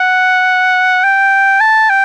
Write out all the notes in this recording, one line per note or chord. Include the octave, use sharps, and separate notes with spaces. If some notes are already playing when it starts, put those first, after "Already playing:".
Already playing: F#5
G5
A5
G5